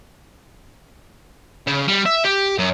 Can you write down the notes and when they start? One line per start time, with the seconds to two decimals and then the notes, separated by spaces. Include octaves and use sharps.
1.67 C#3
1.88 G3
2.06 E5
2.25 G4
2.58 F#2